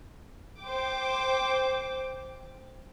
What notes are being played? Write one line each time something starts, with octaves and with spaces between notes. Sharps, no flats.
C5 G5 D6